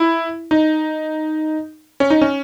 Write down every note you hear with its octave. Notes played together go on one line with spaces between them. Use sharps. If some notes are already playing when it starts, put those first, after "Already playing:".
Already playing: E4
D#4
C#4
D#4
C#4